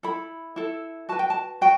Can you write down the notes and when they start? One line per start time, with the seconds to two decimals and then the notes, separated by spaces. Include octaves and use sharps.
0.03 E4 A4 B5
0.56 E4 A4
1.09 F#4 B4 A5
1.19 G5
1.30 A5
1.61 F#4 G5